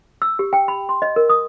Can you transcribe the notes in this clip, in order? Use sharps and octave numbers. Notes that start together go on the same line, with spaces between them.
E6
G4
G5
B5
C6
D#5
A#4
D#6